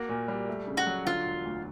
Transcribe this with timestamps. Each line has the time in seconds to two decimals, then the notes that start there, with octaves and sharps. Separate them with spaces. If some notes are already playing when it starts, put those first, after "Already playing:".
Already playing: A#3 F#4
0.09 A#2
0.28 G3
0.48 A3
0.67 C#3
0.77 F#4
0.87 F#3
1.06 D3 F4
1.25 E1
1.45 D2